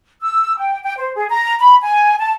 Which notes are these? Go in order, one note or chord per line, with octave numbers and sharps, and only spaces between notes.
E6
G5
G5
C5
G#4
A#5
B5
G#5
A5